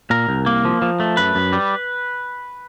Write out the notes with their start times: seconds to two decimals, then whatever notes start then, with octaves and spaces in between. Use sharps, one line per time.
0.10 A#2 A#4
0.29 C2
0.46 A#3
0.65 F3
0.82 F3
1.00 A3
1.17 F#2 B4
1.35 F#2
1.53 G3